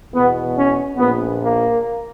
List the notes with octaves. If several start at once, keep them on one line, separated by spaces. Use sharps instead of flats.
E2 B2 B3
C#4
A#1 A#2 B3
A#3